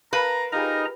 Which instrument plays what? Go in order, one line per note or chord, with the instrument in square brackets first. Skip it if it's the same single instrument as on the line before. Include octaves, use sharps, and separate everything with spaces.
[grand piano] A#4 F5 A5 [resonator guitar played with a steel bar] B4 [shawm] A#5
[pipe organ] D#4 D#5 A#5 [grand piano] F4 G4 G#4 [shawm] A#4